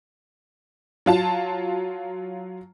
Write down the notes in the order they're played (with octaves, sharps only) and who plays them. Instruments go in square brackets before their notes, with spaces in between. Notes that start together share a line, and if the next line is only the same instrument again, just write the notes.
[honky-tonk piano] F#3 F4 A5